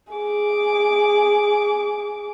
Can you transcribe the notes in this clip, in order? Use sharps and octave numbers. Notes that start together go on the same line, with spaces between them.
G#4 D6